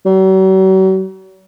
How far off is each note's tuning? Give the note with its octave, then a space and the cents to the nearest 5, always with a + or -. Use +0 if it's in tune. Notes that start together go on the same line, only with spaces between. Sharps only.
F#3 +45